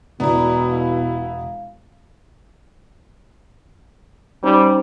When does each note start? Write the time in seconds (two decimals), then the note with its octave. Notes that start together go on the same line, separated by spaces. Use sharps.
0.20 E1 B2 B3 E4 D5 A#5 D#6
0.70 F5
4.43 G3 C#4 D#4 C5